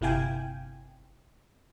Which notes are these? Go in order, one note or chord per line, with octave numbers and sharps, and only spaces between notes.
G1 C3 E4 F5 G5 G#5